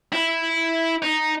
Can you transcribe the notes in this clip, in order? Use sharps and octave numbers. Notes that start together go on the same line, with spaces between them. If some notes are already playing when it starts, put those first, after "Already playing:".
E4
D#4